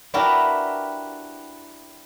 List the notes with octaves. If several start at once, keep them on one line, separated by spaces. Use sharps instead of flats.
D4 E4 F#4 G4 A#4 B4